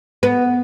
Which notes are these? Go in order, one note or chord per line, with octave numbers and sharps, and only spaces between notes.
B3